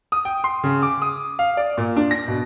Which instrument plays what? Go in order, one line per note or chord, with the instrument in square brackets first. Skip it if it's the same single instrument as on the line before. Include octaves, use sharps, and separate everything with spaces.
[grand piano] D#6
G5
C6
C#3
D6
D#6
F5
D5
A#2
D4
A#6
B2